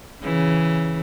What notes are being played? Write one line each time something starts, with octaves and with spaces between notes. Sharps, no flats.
C#3 E3